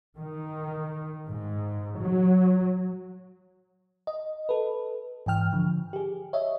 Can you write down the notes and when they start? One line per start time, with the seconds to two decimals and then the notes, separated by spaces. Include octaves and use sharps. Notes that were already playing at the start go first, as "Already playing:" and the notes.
0.15 D#3
1.27 G#2
2.01 F#3
4.07 D#5
4.49 A4 B4
5.26 G#2 E3 G5 F6
5.53 D3 F3
5.93 G4 G#4
6.33 C#5 D#5 E5